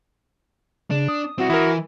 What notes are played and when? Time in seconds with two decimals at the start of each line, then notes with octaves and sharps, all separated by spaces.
0.91 C#3 D4
1.08 D#6
1.38 C4 E4 F#4
1.50 E3 E4 A#4